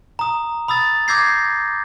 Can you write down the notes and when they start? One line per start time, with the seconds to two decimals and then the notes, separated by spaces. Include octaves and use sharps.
0.19 A#5 D#6
0.68 B5 D#6 E6 A6
1.08 D6 E6 G6 G#6 A#6 C7